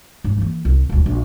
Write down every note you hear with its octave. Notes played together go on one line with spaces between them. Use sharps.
G#2
E3 A#3
C2
D#1 D2
A#1